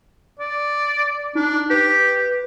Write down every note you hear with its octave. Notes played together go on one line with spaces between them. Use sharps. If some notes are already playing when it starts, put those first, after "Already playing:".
D5
D4 D#4
G4 B4